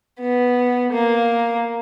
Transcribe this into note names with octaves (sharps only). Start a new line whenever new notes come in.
B3
A#3